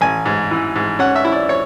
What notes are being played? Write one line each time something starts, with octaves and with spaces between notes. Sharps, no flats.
A1 G#5
G#2
E3
G#2
C#4 F#5
E5
E4
D5
C#5